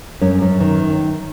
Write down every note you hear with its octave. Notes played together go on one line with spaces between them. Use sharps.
F#2 C#4
F#2
D#3